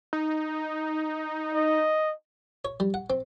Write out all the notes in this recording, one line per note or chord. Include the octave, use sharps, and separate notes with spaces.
D#4
D#5
C#5
G3
F#5
C4